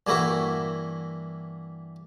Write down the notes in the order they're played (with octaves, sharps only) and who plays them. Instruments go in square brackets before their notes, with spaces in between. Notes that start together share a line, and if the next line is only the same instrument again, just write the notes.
[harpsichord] G2 E3 A#3 E4 F#4